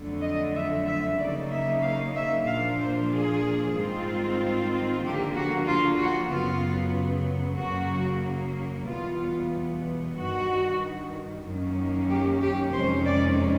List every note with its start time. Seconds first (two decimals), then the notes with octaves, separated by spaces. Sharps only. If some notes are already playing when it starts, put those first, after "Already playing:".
Already playing: F2 D3 F#3 A3
0.22 D#5
0.55 E5
0.86 E5
1.18 C#3 F#3 A#3 D#4 D5
1.51 E5
1.83 F5
2.15 E5
2.47 A#2 F3 A#3 D4 F4 F5
2.79 C5
3.12 G#4
3.75 G#2 D#3 G3 C4 F4
5.03 D3 F3 A#3 G4
5.36 F#4
5.68 F4
5.99 F#4
6.31 F#2 C#3 F#3 B3 F4
7.60 F#2 C#3 F#3 A#3 F#4
8.88 E2 B2 G3 B3 F4
10.17 G2 D#3 G3 F#4
11.45 F#2 D#3 F#3 A#3 C#4
12.09 G4
12.41 G4
12.73 F2 C3 D#3 G#3 C#4 C5
13.05 D5